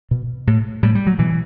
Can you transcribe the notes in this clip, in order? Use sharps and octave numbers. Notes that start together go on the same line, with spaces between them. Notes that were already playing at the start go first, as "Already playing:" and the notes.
B2
A2
A2 G3
G3
F#3
B2 E3